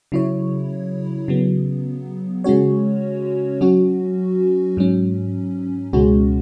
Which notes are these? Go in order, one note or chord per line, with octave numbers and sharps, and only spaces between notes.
C#3 F#3 E4 C#5
C#3 F#3 B3
C#3 G#3 C#4 F#4 C#5
F#3 C#4 F#4
G#2 F#3 C#4
C#2 B2 G#3 C#4 F#4